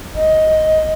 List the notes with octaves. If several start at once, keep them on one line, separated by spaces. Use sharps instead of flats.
B1 D#5